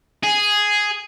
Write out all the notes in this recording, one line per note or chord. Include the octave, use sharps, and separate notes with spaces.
G#4